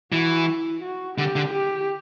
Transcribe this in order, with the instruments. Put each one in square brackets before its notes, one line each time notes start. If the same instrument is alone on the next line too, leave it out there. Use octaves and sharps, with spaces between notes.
[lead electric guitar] E3 [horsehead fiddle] F#4
[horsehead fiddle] E4
F#4
[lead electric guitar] D3 [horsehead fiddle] G4
[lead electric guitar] D3
[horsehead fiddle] G4